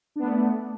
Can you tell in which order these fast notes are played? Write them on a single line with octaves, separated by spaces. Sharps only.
D4 B3 A3